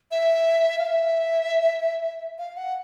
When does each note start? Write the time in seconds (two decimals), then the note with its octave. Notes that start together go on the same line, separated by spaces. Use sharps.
0.11 E5
0.79 F5
0.86 E5
2.38 F5
2.57 F#5